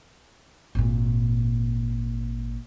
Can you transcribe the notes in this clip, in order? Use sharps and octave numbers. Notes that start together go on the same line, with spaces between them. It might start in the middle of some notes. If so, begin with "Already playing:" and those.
G#1 A#2